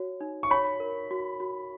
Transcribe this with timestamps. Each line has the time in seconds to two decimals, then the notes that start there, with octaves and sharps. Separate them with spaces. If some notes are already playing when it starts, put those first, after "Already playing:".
Already playing: F#4 C#5
0.21 D#4
0.43 C#6
0.50 C#5 B5
0.80 A#4
1.11 F#4
1.40 F#4